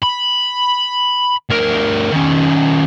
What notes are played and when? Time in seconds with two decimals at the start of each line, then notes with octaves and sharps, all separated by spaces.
0.02 B5
1.50 D2 A#4
2.12 D#3 C#4